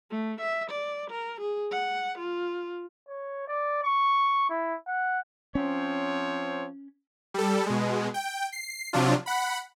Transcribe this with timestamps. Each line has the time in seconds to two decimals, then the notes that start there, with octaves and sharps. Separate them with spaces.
0.10 A3
0.41 E5
0.70 D5
1.11 A#4
1.41 G#4
1.72 F#5
2.18 F4
3.08 C#5
3.48 D5
3.83 C#6
4.50 E4
4.87 F#5
5.55 F3 C4 C#4 C#5
7.34 G3 A4
7.66 B2 G#3
8.14 G5
8.52 C7
8.93 C3 F3 F#3 D4 F4
9.26 F#5 B5